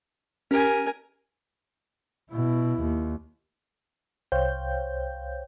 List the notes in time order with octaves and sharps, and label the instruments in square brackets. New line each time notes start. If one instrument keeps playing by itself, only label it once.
[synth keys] C#4 G4 [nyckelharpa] A#4 G#5
[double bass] B2 E4
D#2
[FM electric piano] C2 C5 C#5 F5 G5 G6